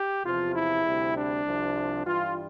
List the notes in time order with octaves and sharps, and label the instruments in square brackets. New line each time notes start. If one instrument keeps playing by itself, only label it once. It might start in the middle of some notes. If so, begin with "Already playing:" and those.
Already playing: [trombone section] G4
E2 C3 F3 F4
E4
D2 C3 G3
D4
C2 C3 F3
G2 E3 G3 F4